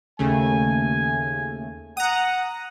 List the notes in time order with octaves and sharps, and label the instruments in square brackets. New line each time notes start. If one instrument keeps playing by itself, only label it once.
[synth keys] D#2 C#3 A3 [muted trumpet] G#5
[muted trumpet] F#5 [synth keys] A#5 D#6